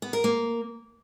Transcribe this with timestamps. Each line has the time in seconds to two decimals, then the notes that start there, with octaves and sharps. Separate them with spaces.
0.02 B3
0.13 A#4
0.24 A#3